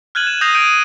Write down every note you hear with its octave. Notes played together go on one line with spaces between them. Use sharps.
F6 F#6 G#6 D#7 F#7
E7
D#6 G6 A#6 C7 D#7 F7
G6 D7 D#7